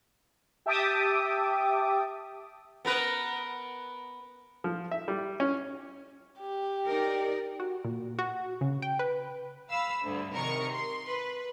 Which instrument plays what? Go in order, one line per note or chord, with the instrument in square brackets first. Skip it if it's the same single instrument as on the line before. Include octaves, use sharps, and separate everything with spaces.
[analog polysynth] G4 E5 G5 A5 D6 D#6
[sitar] B3 A#4 B4
[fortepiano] F3
E5
G3
C#4
[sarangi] G4
[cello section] D#4 A#4 D5
[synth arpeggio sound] F#4
A#2
F#4
C#3
G5
B4
[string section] F5 B5 E6
D2 G2
G#1 C3 D#3 A#4 C#6 C#7
C6
B4